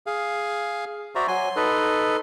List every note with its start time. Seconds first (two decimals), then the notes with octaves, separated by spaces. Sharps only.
0.07 G#4 F5
1.15 F#4 C5 D5 E5 A#5
1.28 F#3 G#5 C6
1.56 D#4 A4 B4